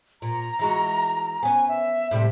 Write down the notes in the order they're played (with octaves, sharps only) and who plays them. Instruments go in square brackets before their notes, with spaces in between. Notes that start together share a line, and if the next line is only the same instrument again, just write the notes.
[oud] A#2 [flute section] A#5
[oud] E3 G#3 F#4
[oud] B3 C#4 [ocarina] G#5
[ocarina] E5
[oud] A2 C3 G3 [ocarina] E5